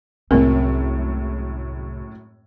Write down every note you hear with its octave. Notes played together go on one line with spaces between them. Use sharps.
C2 F#2 A2 C3 G#3 C4 A#4